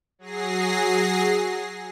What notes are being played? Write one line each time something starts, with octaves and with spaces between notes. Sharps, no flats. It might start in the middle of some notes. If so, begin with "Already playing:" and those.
F#3 G#4 A#6 C7